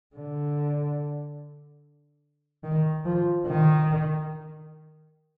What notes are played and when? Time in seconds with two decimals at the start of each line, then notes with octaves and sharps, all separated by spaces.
0.16 D3
2.63 D#3
3.05 F3
3.47 D#3